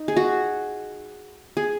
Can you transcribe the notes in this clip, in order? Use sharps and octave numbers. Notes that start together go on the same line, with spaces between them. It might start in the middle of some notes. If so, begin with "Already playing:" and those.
Already playing: D#4
G#4
F#4
G#4